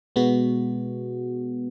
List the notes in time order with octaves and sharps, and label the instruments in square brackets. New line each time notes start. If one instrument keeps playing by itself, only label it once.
[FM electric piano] B2 G#3 B3 F#4